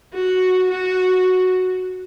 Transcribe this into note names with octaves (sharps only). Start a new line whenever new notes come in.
F#4
F#4